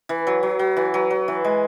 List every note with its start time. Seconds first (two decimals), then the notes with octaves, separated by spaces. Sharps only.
0.09 E3
0.27 F#3
0.43 F#3
0.59 F#3
0.77 E3
0.94 F#3
1.11 F#3
1.28 E3
1.44 G#3